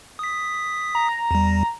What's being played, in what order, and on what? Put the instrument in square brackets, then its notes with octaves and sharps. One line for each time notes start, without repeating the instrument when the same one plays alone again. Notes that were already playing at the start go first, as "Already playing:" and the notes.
[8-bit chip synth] D#6 B6
[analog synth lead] A#5
[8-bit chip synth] E2 G3